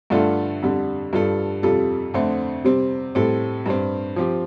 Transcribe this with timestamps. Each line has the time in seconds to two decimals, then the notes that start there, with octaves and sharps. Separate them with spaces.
0.10 G2 D3 A3 F4 A4
0.62 F2 D3 G3
1.13 G2 G3 F4 A4
1.63 F2 C3 G3 F4 A4
2.14 F2 D3 A3 C4
2.64 C3 G3 C4
3.15 A2 G3 C4 A4
3.66 G2 G3 C4
4.16 F3 C4 G4